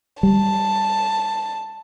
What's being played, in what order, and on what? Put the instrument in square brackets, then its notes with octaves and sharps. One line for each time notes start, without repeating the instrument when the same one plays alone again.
[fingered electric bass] G3 [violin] A5